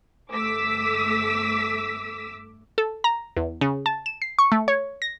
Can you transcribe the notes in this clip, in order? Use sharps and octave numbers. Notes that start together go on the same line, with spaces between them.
G1 A3 D6 E6 B6
A4
A#5
E2
C#3
A5
E7
C7
C#6
A3
C#5
A#6